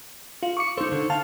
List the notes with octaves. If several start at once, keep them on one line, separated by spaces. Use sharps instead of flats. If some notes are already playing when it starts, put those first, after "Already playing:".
F4
C#6 D6 C#7
D#4 A4 C5
D3
F5 A5